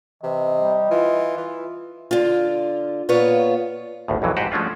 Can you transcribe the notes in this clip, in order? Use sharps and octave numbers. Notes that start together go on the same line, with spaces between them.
C3 E3 D#5
G3
E3 F4
E3
D3 F4
A#2 B3 F4 B4 C#5
G#1 D2 A2
B1 F2 E3 F#3
G#2 F#4 G4 B4 C5 F#5
F3 G#3 A3 C#4 D4 F4